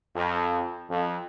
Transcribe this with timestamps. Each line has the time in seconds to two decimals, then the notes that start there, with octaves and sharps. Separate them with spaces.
0.16 F2
0.89 F2